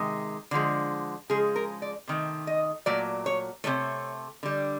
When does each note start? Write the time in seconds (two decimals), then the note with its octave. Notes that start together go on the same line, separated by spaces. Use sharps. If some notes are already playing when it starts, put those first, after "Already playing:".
Already playing: C3 D#3 G#3
0.51 D3 F3 G#3
1.30 C#3 F3 G#3 G#4
1.56 A#4
1.82 D5
2.07 C3 D#3 A3
2.47 D#5
2.86 A#2 F#3 A3 D5
3.26 C#5
3.64 C3 F3 A3 C#5
4.43 D3 G3